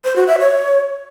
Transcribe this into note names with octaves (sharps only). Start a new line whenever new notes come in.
C5
F#4
E5
C#5